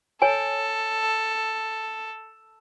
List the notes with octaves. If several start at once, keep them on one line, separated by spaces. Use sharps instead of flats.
A4 C#5 G#5